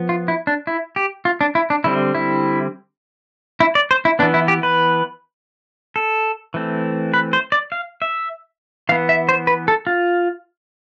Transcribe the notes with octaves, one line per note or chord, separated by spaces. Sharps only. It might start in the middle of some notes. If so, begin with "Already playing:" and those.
Already playing: F3 B3
F4
E4
D4
E4
G4
F4
D4
E4
D4
D3 G3 C4 E4
E4
E4
D5
C5
E4
E3 B3 D4
E4
G4
B4
A4
E3 A3 C4
B4
C5
D5
F5
E5
E3 B3 F5
E5
C5
B4
A4
F4